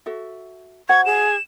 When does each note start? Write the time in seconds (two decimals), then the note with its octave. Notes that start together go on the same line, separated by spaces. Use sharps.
0.06 F#4 A4 E5
0.89 F#4 C5 F#5 C#6 G#6
1.06 G#4 E7